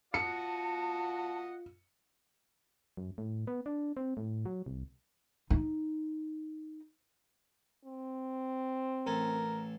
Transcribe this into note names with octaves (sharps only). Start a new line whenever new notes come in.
F4 F#4 D#5 F#5 A5 C#7
F#2
A2
B3
D4
C4
A2
F#3
C2
D#4
C4
A1 A4 A#4 G#5